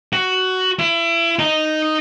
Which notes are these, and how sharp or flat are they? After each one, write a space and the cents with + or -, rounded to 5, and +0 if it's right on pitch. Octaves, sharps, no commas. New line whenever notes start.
F#4 +10
E4 +30
D#4 -5